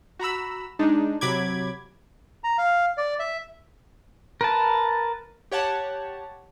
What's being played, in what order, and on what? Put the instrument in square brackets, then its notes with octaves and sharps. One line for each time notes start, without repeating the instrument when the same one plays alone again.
[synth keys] F#4 A#5 B5 E6
G#3 D4 D#4
C3 F#3 B5 D6 G#6
[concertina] A#5
F5
D5
E5
[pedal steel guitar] A#4 B4 A5
[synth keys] G4 C#5 F#5 A5